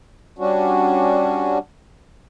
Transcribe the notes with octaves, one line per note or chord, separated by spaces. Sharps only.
G3 C#4 D4 F#4